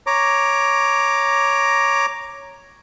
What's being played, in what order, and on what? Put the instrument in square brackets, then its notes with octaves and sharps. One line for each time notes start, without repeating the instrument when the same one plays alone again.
[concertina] C#5 A#5 D6